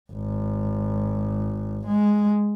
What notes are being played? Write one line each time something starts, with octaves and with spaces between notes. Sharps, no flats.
G#1
G#3